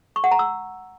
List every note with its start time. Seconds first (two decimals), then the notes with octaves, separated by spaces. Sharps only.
0.16 C#6
0.24 F#5
0.31 A#5
0.39 E6